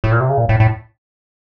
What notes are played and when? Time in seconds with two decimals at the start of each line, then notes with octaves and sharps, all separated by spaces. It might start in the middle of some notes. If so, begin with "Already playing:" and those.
0.04 A2
0.12 A#2
0.20 C3
0.29 C#3
0.38 A#2
0.49 A2
0.60 A2